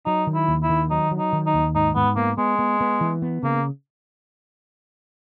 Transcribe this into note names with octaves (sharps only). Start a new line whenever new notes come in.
F#3 D#4
D#3
E4
D#2
E4
D#3
F#3 D#4
F#3
D#4
D#3
D#4
D#2
G#2 D#4
G#2 B3
A#3 B3
G#3 B3
B3
B3
E3
B3
C#3 A#3